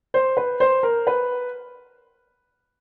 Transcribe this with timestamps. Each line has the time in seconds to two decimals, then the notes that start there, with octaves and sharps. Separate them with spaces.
0.14 C5
0.37 B4
0.60 C5
0.83 A#4
1.07 B4